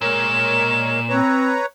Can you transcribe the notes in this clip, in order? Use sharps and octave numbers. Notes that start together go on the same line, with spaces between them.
A#2 G#3 A#4 C#5 E7
C4 B4 C#5 A#5